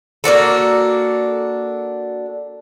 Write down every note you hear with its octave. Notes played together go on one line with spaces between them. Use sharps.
A#3 D4 F#4 A4